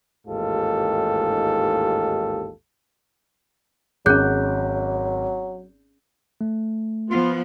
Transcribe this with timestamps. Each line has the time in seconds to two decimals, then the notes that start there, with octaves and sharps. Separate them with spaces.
0.27 A1 D#2 G#2 F4 G4 A4
4.06 G#1 F#3 C#4 G#4 F#6 G6
6.41 A3
7.11 F3 B3 F4